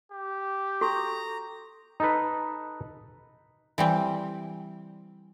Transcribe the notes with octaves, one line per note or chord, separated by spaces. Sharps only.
G4
F#4 A4 A#5 C#6
D#4 A4 B4
E3 G3 C4